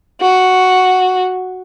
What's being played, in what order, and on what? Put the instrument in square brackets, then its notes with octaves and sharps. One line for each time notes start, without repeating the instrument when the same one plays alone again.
[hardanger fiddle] F#4